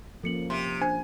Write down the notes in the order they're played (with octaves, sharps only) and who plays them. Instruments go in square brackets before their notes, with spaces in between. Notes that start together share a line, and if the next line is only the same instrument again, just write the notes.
[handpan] F3 A#3 C#4 [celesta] A4 C#7 F#7
[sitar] C3 [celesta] C6
[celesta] D4 C5 [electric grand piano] G#5